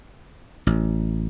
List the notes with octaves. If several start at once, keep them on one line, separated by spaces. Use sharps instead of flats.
A1